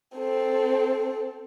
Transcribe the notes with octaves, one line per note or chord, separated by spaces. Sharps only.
C4 A4